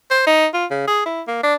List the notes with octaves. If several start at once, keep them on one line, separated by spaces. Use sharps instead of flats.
C5
D#4
F4
C#3
G#4
E4
A#3
D4